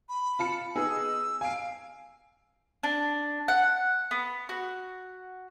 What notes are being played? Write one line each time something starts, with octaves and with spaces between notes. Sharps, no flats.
B5
F4 A5 C#7
B3 D#4 G#4 E6
F5 G#5 D7
D4
F#5
B3
F#4